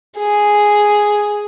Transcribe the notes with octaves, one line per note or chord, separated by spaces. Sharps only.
G#4